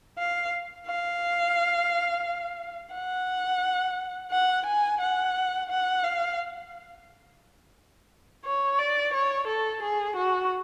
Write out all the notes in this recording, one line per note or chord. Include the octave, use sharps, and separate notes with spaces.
F5
F5
F#5
F#5
G#5
F#5
F#5
F5
C#5
D5
C#5
A4
G#4
F#4